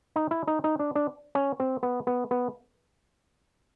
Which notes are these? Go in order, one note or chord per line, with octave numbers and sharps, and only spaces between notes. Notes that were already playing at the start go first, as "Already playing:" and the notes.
D#4
E4
D#4
D#4
D4
D4
C#4
C4
B3
B3
B3